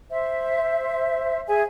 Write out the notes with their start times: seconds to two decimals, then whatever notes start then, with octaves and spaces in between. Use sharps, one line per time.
0.10 C5 E5
1.47 G#4 E5 G#5